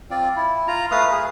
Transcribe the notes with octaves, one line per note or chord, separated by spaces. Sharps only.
C4 F4 D5
E4
F4 A#5
A3 B4 F5 D#6
G#4